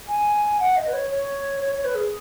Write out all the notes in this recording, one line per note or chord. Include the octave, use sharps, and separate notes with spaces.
G#5
F#5
D#5
B4
C#5
C#5
C#5
C#5
B4
G#4